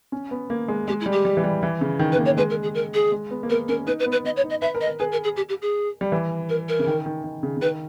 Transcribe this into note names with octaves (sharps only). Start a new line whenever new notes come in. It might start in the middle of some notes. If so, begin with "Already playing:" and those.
C#4
B3
A#3
G#3
G#3 G4
E4
G3
G4
G3
E3
G3
E3
C#3
D#3
B4
A#3
C#5
G#3 B4
A#4
G#4
A#4
G#4
G#3
B3
A#3
B3 A#4
C#4 A#4
D#4 B4
B4
B3
B4
B3 D#5
C#5
D#4
D#5
B4 E5
A#4
D#5
A#4
G#4 B4
A#4
G#4
G4
G4
G#4
G3
E3
A#4
A#4
C#3
D#3
D#3
D#3
C#3
C#3
D#3 B4